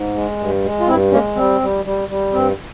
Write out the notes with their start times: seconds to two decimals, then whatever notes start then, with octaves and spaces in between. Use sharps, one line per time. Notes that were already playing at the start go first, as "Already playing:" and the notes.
Already playing: G#2
0.15 G#3
0.39 G2
0.63 G#3
0.80 F4
0.87 G2 C4 E4
1.11 G#3 A#3 C#4
1.36 G3 C4
1.61 G3
1.85 G3
2.08 G3
2.33 G2 C4